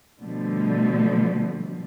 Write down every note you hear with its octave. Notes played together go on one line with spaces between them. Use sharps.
B2 D3 F3 G3 A3